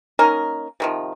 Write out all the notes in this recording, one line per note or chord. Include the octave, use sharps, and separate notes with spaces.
A#3 C#4 D#4 A#4
C3 D#3 F3